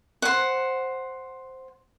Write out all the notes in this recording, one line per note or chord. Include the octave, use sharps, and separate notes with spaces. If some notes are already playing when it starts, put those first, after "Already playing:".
C5 F#5